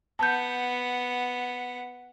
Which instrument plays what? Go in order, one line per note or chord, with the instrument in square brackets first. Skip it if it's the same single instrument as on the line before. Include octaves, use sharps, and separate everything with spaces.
[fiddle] B3 F#5 [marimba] A5 G6